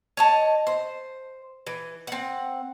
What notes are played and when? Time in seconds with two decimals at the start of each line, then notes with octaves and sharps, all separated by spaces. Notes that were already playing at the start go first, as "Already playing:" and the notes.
0.17 C#5 D#5 A5
0.67 C5
1.67 E3
2.07 C4 F#5